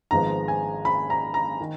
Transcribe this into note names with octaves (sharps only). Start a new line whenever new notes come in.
G#1 G#2 F3 G#3 B3 A#5
G#5
B5
A#5
A#5
D#3